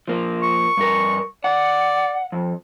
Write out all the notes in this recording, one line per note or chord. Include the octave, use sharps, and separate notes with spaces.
F3 A#3
C#6
G2 A#4
D5 F#5
F2